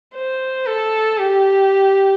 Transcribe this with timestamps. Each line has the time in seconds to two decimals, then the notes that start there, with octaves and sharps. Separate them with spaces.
0.14 C5
0.67 A4
1.20 G4